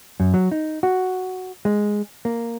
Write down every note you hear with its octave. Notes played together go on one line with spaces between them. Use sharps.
F#2
F#3
D#4
F#4
G#3
A#3